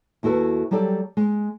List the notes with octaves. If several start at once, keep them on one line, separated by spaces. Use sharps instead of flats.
D#2 E4 F#4 A4 B4
F#3 G3 G4 A4 D5
G#3